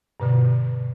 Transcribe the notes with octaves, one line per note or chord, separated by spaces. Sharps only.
G2 B2 D3